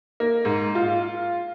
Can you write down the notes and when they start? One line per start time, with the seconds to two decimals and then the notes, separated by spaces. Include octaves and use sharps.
0.20 A#3
0.45 G#2
0.75 F4